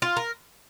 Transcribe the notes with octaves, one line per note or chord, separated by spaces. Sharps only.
F4
A#4